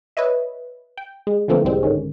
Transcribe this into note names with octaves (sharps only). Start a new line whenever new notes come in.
B4 C#5 D#5 E5
G5
G#3
D3 E3 F3 A3 A#3 C4
C2 A2 G3 G#3 C4
G#2 D3 D#3 C#4